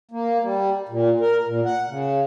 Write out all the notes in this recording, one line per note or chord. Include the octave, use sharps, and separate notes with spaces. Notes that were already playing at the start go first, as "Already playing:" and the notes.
A#3
G3
A#2
A#4
A#2
F#5
C#3